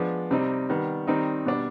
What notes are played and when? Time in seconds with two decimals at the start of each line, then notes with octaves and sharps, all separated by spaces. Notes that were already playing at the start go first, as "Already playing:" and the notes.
Already playing: F3 G#3 B3 D4
0.31 C3 G3 C4 D#4
0.70 D#3 G3 B3
1.07 D#3 G3 C4 D#4
1.46 B2 G3 D4